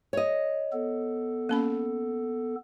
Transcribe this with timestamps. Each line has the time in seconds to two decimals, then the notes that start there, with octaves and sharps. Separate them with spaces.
0.13 C#5 D#5
0.72 B3 A4
1.49 A#3 C#4 B5